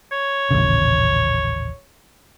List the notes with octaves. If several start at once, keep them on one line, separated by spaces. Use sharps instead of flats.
C#5
D#1 A1 C#3